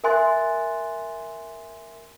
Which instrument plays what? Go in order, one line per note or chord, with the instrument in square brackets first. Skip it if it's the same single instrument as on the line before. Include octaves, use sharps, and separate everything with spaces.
[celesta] A#4 E5 G#5 C6 F#6 A6